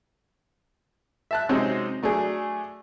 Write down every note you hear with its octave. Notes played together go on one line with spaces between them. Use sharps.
E5 A5 F#6
C3 G#3 C4 C#4 D#4 F#4
F#3 A3 D4 G#4